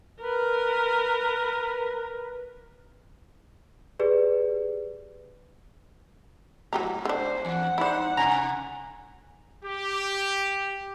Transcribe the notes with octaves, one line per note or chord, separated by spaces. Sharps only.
A#4 B4
G4 G#4 B4 D5
G#2 F#3 G4 A#5
D3 D4 C5
E2 F#5
G2 D#4 E4 C5 D5
C3 A#5
G4